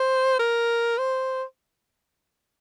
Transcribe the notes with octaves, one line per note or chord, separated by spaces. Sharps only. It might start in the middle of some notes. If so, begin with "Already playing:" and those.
Already playing: C5
A#4
C5